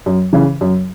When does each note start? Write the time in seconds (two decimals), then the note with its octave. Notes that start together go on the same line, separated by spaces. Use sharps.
0.06 F#2
0.33 C#3 E3
0.61 F#2